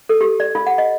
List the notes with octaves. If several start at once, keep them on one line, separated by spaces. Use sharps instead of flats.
A4
G4
D5
F4
F#5
D#5